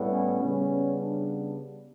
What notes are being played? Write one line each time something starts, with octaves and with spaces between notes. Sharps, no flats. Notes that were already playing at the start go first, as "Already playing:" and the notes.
Already playing: A2 G3 B3
C#4
C#3 G3 B3 C#4
D4